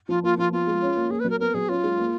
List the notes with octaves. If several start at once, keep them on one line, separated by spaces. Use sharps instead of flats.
F3 F4
A#3 F4
F3 F4
B3 F4
G#3
C#4
A#3
A#3 G#4
F#3 B4
A#4
B3 A#4
F#3 G#4
C#4 F4
G#3
A#3